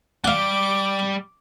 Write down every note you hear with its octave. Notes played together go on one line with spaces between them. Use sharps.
G3 F5 F#5 D6